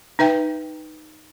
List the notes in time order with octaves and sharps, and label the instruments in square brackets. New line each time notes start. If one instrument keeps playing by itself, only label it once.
[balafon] D#4 B4 E5 G5